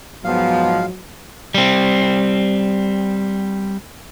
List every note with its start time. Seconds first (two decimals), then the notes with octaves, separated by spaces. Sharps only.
0.24 G#2 F3 F#3 B3 F5
1.54 G3 C4